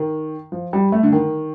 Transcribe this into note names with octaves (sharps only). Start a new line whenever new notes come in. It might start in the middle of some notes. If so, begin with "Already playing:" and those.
Already playing: D#3
F3
G3
A3
D3
D#3